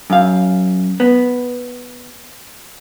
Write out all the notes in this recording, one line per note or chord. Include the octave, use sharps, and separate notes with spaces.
F#2 F5
B3